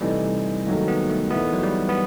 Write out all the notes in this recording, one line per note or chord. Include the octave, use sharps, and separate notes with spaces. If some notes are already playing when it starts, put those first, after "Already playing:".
C3 E3 G3 A3 D#4
D#2 D#3 F#3 A3
B3
A3
E2 D#3 A3 B3 E4
F#3
G3
B3